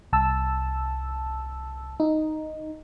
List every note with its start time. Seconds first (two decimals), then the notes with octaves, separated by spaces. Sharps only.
0.13 C2 A5 E6
2.00 D#4